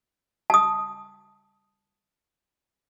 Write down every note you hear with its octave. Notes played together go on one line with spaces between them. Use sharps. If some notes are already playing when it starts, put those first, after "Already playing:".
A5 D#6